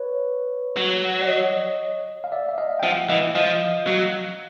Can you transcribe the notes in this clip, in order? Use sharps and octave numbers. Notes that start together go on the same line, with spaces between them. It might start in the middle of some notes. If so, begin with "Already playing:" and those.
Already playing: B4 C#5
F#3
D5
C#5 D#5
F5
D5 E5
E5
D#5 F5
G5
F3 E5 F#5
E3 D#5 F5
F3 D#5 F5
F#3